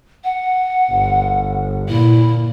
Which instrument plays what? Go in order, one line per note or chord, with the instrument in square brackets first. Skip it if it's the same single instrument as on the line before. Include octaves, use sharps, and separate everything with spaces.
[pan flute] F#5
[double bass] G1
[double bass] A#2 [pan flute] E4